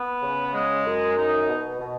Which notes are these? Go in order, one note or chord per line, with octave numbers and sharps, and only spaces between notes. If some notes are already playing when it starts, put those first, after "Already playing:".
Already playing: B3
C#3
G#3
F#2
D#4
B2
B2